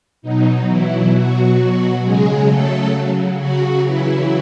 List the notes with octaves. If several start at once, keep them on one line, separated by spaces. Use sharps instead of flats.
B2 F#3 D#4
E3 E4
F#3 F#4
C#3 F#3 G#3 G#4
A3 A4
F#3 F#4
C#3 E3 F#3 E4